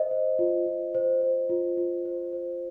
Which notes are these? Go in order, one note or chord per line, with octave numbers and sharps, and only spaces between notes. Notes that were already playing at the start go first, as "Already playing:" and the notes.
Already playing: C5 D#5
C5
F4
F4
C5
C5
F4
F4
C5
C5